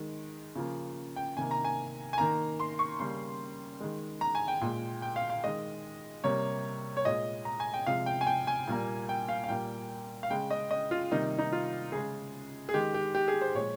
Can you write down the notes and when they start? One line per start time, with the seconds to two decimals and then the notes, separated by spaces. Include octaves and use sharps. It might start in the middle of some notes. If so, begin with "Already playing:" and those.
Already playing: D#3 G#3
0.55 C#3 F3 A#3
1.16 G5
1.37 C3 D#3 A#3 G#5
1.51 A#5
1.64 G#5
2.13 G#5
2.18 D#3 A#3 A#5
2.60 C6
2.79 C#6
2.99 C#3 G3 A#3 C6
3.80 D#3 G#3
4.21 A#5
4.35 G#5
4.48 G5
4.61 A#2 G#3
5.02 G5
5.16 F5
5.30 F5
5.44 D#3 G#3 D#5
6.24 C3 G3 A#3 C#5
6.97 C#5
7.05 A#2 G#3 D#5
7.45 A#5
7.60 G#5
7.74 G5
7.87 C3 F3 G#3 F5
8.06 G5
8.21 G#5
8.27 G5
8.47 G#5
8.67 A#2 G3 A#3
9.09 G5
9.29 F5
9.44 F5
9.49 A#2 G3 A#3 G5
10.23 F5
10.30 C#3 G#3 G5
10.50 D#5
10.71 D#5
10.91 F4
11.11 C3 D#3 G3 A#3 D#4
11.39 D#4
11.52 F4
11.92 C#3 G#3 G#4
12.69 G#4
12.74 D#3 G#3 G4
12.94 G4
13.15 G4
13.28 G#4
13.41 C5
13.54 A#2 F3 G#3 C#5